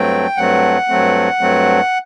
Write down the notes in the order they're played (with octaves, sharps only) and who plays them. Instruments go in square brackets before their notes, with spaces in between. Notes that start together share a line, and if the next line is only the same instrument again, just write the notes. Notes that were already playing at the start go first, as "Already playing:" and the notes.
Already playing: [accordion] G2 F#3 A3 C4 G5
G2 F#3 A3 C4 F#5
G2 F#3 A3 C4
G2 F#3 A3 C4